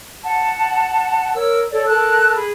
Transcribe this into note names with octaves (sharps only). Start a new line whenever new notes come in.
F#5 A5
A#4 C#5 E6
A4 C#5 D5
A4 A#4 A5 F#6
G#4 B5